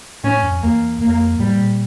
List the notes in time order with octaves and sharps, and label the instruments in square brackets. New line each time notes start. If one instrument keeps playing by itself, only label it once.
[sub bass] A2 [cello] C#4
[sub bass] F2
[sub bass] E2 [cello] A#3
[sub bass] F2 [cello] A#3
[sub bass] A2 [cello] G3
[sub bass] A#2